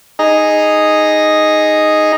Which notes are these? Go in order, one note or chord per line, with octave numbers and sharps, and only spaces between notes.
D#4 G#4 D#5 A#5